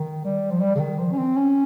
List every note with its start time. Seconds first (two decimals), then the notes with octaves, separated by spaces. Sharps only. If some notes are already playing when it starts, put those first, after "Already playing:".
Already playing: D#3
0.24 G3
0.51 F3
0.61 G3
0.75 C#3
0.80 D#3
0.99 F3
1.13 C#4
1.18 C4
1.36 C#4